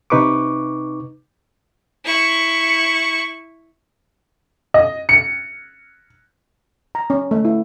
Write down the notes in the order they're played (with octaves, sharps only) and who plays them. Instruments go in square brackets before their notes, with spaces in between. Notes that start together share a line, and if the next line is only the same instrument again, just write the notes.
[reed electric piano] C3 D#4 B4 C#6 D6
[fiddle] E4 C#6
[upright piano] D#5
C#7
[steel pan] A#5
C#4
A3
E4